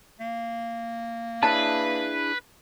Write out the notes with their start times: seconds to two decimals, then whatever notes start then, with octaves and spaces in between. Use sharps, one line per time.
0.20 A#3
1.43 D4 E4 G#4 B4 C#5 A5